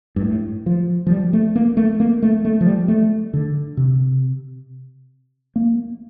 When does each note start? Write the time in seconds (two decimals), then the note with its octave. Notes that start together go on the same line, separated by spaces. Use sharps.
0.16 G2
0.22 A2
0.66 F3
1.07 F3
1.10 G3
1.33 A3
1.56 A#3
1.77 A3
2.00 A#3
2.22 A3
2.45 A3
2.61 F3
2.66 G3
2.88 A3
3.34 D3
3.77 C3
5.56 A#3